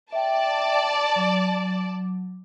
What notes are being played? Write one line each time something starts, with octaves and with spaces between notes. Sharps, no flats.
D5 E5 G5 A5
F#3